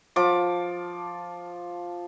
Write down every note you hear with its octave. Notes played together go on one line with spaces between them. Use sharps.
F3 D6